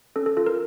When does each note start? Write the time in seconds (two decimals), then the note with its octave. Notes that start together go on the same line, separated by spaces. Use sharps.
0.16 C#4 A4
0.26 A4
0.37 F4 A4
0.47 A#4